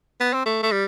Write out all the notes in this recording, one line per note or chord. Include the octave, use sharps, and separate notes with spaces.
B3
C4
A3
A3
G3